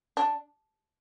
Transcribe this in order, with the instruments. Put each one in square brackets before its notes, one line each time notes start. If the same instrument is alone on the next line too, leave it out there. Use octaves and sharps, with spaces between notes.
[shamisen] D4